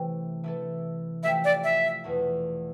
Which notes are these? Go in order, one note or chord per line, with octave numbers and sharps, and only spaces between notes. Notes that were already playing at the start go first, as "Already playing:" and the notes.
Already playing: C3 E3 A3 E4 G4
E3 A3 E4 A4
F3 A3 E4 G4 E5
D5
E5
E2 B2 A3 E4